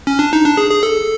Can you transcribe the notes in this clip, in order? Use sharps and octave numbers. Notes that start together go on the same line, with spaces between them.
C#4
D4
D#4
D4
G#4
G#4
A4